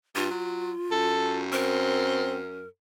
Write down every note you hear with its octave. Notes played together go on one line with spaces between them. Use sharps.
G2 F4
F#3
F#2 A4
C4 A#4